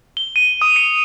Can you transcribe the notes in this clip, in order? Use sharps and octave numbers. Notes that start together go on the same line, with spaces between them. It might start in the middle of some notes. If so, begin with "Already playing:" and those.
G7
D#7
D#6
C#7